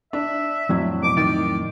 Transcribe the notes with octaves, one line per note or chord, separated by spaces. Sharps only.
D4 E5
F2 A2 F#3
B2 D6
D#3 D5